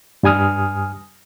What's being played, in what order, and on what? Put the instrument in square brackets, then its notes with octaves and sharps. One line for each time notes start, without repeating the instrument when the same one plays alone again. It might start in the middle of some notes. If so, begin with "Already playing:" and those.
[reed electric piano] G2 G3 G#5 D#6 F6